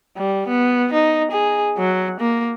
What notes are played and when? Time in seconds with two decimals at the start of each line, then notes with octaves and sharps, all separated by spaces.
0.17 G3
0.48 B3
0.93 D#4
1.31 G#4
1.78 F#3
2.20 A#3